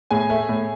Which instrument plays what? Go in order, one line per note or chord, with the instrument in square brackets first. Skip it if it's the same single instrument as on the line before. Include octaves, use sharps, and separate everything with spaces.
[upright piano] A2 G#4 G#5
A3
A2